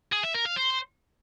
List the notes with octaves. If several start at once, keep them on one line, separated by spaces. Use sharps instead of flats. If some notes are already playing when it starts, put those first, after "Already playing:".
G#4
E5
A#4
F5
C5